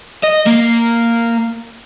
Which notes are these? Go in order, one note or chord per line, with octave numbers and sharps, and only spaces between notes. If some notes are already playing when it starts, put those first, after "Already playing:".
D#5
A#3